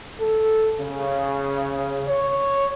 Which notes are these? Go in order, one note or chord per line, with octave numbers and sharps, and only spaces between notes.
A4
C#3
C#5